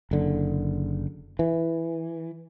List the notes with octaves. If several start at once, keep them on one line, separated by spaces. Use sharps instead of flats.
F#1 D3
E3